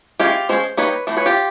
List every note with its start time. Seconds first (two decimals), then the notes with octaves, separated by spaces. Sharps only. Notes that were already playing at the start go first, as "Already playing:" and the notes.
0.20 G#3 C#4 E4 F4 G4
0.49 F3 G#3 C#4 C5
0.77 G3 A#3 D#4 B4 C#5
1.07 E3 A3 C4
1.17 B4 C#5
1.26 F4 G4